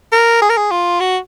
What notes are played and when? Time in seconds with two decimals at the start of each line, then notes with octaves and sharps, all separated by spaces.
0.12 A#4
0.42 G#4
0.49 A#4
0.57 G#4
0.71 F4
1.00 F#4